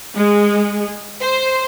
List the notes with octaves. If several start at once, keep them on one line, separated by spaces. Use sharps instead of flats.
G#3
C5